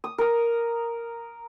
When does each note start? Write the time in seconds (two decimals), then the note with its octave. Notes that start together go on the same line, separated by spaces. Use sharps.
0.04 D#6
0.18 A#4 D#6